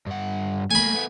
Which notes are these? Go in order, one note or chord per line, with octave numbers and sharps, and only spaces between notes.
G2 F#5
A3 A#3 G#5 B5
A3 B3